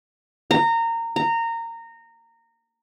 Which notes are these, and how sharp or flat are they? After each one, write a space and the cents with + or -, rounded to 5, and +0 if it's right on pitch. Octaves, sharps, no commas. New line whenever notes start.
A#5 -20
A#5 -20